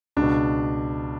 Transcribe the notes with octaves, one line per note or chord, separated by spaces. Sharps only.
C#2 B2 D4